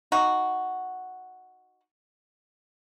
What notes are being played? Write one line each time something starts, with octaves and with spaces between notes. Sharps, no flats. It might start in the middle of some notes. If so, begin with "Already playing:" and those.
D#4 F#4